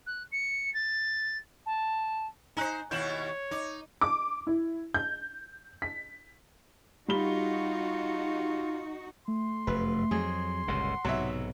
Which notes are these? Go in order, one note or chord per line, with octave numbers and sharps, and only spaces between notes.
F#6
C#7
A6
A5
D#4 C5 G#5 A#5 F#6
D#2 B2 E4 C#5 G6 E7 F#7
D#4 D6
D6
E4
G6
B6
G3 D#4 F4 F#4 B5 G7
A3 C6
F1 F#2 B4
F2 F#3 G#4
G1 C#2 A#2 F#5
B1 G#2 C3 F#3 E5